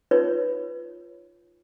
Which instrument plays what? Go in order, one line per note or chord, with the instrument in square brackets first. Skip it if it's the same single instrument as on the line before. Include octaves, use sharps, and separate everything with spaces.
[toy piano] D#4 F4 B4 C#5